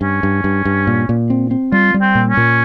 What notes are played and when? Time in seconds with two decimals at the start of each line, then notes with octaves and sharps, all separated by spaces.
0.01 G2 C#4
0.23 G2
0.44 G2
0.65 G2
0.87 A#2
1.09 A#2
1.30 C4
1.51 C4
1.72 G3 F4
1.94 G3
2.01 C4
2.15 A#2
2.30 C#4
2.37 A#2